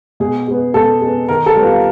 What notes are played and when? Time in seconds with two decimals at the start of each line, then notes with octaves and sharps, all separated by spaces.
0.20 B2 G#4
0.47 G#3 B3
0.74 B2 A4
1.01 G#3 B3
1.29 D#3 A#4
1.46 A4
1.55 G3 B3
1.64 F4